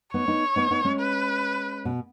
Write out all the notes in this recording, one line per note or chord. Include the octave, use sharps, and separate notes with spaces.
B3 D#4 C#5
B3 D#4
B3 D#4
B3 D#4
G#3 C#4
B4
B2